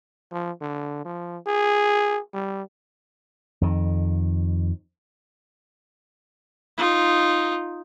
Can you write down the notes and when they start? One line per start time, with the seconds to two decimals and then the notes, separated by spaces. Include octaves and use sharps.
0.32 F3
0.61 D3
1.05 F3
1.47 G#4
2.34 G3
3.61 F2 D#3
6.78 D#4 F4